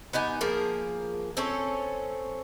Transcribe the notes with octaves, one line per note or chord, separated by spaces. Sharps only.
B3 D#4 G4 G#5
F3 A#3 G#4 A#4
C4 C#4 A4 C#5